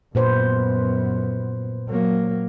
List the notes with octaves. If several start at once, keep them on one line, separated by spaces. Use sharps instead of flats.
F#2 A#2 B3 B4 C5
F#3 A#3